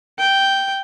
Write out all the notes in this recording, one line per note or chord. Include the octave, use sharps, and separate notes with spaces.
G5